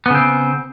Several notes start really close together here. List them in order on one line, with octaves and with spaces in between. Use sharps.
B3 C#3 C4